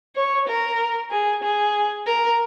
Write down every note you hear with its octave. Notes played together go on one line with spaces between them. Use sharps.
C#5
A#4
G#4
G#4
A#4